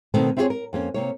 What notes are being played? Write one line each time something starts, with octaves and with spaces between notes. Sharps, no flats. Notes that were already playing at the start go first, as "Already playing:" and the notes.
B2 D#3 A3 A#3 C4 D#4
C4 E4 F4 G4 G#4 C#5
A#4
F2 A#3 C#4
C3 A#3 C#5